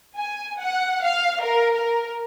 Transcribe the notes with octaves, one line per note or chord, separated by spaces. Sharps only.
G#5
F#5
F5
A#4
A#4